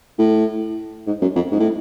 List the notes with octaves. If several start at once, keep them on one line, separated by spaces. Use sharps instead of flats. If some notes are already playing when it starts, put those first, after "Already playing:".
A2
G#2
F#2
F2
G#2
A2